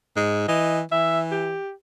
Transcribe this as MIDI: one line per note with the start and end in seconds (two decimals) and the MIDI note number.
0.16 0.44 44
0.16 0.45 56
0.48 0.83 52
0.48 0.79 75
0.91 1.58 52
0.91 1.19 76
1.31 1.70 67